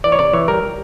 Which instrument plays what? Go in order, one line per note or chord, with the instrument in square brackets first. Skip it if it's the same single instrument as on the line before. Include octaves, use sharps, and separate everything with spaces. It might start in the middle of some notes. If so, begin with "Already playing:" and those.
[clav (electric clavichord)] E3 D5
C#5
C3 D5
E3 C#5
G3 A#4
G3